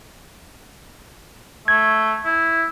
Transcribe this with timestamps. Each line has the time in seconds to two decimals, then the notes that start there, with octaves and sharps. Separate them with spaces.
1.68 A3 G#6
2.25 E4